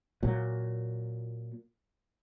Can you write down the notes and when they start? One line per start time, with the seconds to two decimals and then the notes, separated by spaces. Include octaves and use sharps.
0.23 A#2 F#3